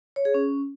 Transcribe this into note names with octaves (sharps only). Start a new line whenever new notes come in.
C#5
G#4
C#4